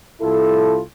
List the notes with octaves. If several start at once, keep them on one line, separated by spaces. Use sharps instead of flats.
C2 E4 F4 A4